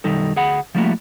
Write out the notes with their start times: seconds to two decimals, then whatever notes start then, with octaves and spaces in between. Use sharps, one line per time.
0.04 B1 F#2 D#3 G3 D#4 A4
0.36 D2 G#4 F#5 B5
0.75 F3 G3 A3 A#3 E4 F#4